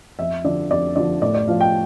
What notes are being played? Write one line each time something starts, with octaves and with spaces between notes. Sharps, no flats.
F2 E5
D3 F3 D5
F2 D5
D3 F3 D5
A2 D5
D5
F3 F5
G5